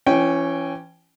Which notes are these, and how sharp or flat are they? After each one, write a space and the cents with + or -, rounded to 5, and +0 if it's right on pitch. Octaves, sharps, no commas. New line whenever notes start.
E3 +40 C#4 +0 G5 +0